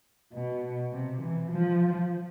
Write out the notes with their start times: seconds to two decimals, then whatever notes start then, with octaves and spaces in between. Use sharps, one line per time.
0.33 B2
0.92 C3
1.22 E3
1.51 F3